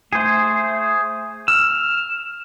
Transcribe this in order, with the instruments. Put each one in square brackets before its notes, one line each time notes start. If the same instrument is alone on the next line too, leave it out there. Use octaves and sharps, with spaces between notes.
[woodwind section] A3 [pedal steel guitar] G#4 C5
[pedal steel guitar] E6 [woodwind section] F6